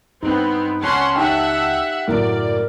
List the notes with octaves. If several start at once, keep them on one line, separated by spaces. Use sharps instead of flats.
G2 B3 C4 D#4
C#2 C#4 F#5 A5 C6
D#4 G4 E5 F#5 G5
F#2 A2 C#3 F#3 A#4 D5